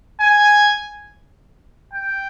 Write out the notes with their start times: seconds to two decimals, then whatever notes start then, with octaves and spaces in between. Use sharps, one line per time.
0.21 G#5
1.94 G5